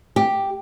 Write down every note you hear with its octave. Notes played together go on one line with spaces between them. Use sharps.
G4